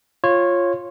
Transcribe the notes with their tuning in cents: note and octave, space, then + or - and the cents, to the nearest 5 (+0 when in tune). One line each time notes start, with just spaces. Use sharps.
F4 +0 C#5 -15